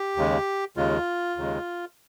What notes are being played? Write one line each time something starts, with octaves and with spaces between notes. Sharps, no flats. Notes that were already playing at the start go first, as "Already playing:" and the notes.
Already playing: G4
D#2 C#3 G#3
D#2 C#3 G#3 F4
D#2 C#3 G#3